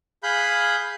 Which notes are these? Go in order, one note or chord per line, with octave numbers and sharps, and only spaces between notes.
G#4 F5 B5 F#6 G6